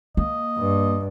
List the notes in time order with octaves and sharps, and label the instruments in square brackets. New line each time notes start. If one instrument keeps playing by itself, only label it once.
[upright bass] A#3 [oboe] D#5
[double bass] G2